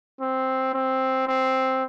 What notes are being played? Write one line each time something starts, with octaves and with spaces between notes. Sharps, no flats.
C4
C4
C4